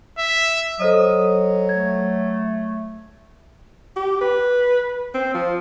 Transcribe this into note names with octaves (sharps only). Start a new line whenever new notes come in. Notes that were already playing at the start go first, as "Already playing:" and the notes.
E5
F#3 A4 C5 D#5 D#6
A3 G#6
G4
B4
C4
F3